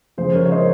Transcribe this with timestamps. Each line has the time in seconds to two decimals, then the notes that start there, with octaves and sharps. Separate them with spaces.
0.18 C#3 F3 G#3 G#4 C5
0.35 A#4 C#5
0.45 C#5
0.51 C5 D#5